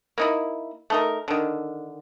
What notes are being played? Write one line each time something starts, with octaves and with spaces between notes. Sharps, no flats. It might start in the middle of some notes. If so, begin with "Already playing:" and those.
A#3 D#4 E4
A3 D#4 A#4
D3 D#3